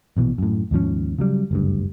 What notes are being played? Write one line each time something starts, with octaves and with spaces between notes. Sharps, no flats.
A#1 B2 E3
F#2 A2
D#2 G#2 F3 C#4
C#3 F#3 G3
F#1 D2 G2